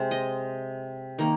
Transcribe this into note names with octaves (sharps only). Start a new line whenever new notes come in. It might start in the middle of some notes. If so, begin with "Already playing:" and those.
Already playing: C3 G#3 C5
D#5
D#3 A#3